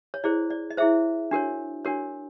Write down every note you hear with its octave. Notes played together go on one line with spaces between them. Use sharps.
C#5
E4 G#4 C5 D5
D5
D#5
E4 G#4 C5 E5
D4 F#4 A#4 C#5
D4 F#4 A#4 C#5